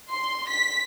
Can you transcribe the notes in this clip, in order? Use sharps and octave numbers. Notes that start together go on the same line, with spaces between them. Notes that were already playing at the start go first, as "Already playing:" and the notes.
C6
B6